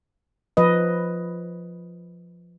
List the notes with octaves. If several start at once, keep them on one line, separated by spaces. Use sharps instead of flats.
F3 B4 D#5